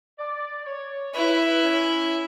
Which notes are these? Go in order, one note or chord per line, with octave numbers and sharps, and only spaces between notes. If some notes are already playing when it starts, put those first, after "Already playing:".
D5
C#5
E4 B4
C#4